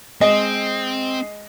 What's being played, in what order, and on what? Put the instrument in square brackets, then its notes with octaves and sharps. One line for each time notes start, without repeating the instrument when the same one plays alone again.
[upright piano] G#3 D#5 [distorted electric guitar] C4